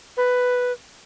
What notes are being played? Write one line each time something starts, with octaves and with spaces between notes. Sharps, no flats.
B4